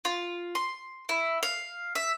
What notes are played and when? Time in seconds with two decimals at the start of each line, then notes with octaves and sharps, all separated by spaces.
0.05 F4
0.55 C6
1.09 E4
1.43 F5
1.95 E5